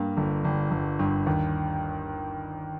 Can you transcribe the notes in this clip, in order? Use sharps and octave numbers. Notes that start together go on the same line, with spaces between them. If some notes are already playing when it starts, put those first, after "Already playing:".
Already playing: G2 A#3
G1
G1
G1
G2
D#2